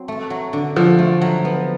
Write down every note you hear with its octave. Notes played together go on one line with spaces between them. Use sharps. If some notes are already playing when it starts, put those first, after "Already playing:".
Already playing: F#3 C4
A3
F#3
D3
D3 F3
A3
F#3
B3